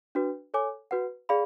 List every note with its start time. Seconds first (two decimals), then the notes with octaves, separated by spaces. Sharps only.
0.15 D4 F#4 B4
0.54 A4 C#5 G#5 D6
0.91 F#4 B4 F#5
1.29 G#4 D5 F5 B5